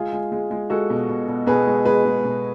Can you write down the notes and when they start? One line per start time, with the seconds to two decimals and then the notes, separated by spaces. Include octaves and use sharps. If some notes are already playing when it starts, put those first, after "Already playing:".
Already playing: G#3 F4 G#4
0.13 G#3
0.32 G#3
0.51 G#3
0.70 G#3 F#4 A4
0.90 B2
1.09 B2
1.28 B2
1.47 B2 G#4 B4
1.67 G#3
1.85 G#3 G#4 B4
2.05 G#3
2.25 B2